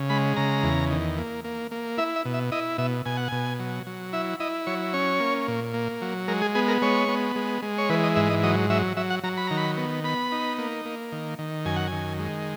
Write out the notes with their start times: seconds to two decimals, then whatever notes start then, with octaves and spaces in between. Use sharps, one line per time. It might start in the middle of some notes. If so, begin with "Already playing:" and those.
Already playing: C#3
0.10 G#3 B5
0.36 C#3 A#5
0.63 E2
0.90 D#3
1.18 A#3
1.44 A#3
1.71 A#3
1.98 E4 E5
2.16 E5
2.25 B2
2.34 E5
2.52 E4 D#5
2.78 B2 E5
3.06 B2 G#5
3.17 F#5
3.28 B2 G#5
3.59 F#3
3.87 F#3
4.13 E4 E5
4.40 E4 D#5
4.67 F#3 C#5
4.93 C#4 C#5
5.20 A#3
5.48 A#2
5.74 A#3
6.02 F#3
6.28 G#3 A#4
6.42 G#4
6.55 B3 G#4
6.68 A#4
6.82 G#3 C#5
7.09 B3
7.36 G#3
7.62 G#3
7.78 C#5
7.89 E3 B4
8.03 D#5
8.16 G#2 E5
8.30 D#5
8.43 F#3 D#5
8.70 F#3 E5
8.97 F#3 E5
9.10 F#5
9.23 F#3 A#5
9.37 B5
9.47 D#3 A#5
9.57 B5
9.77 B3
10.04 B3 B5
10.32 D#4
10.58 A#3
10.85 A#3
11.12 D#3
11.39 D#3
11.65 F#2 G#5
11.76 F#5
11.87 D#3 G#5
12.19 G#3